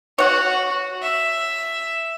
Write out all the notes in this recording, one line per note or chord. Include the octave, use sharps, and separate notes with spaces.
F#4 C#5 F#5
E5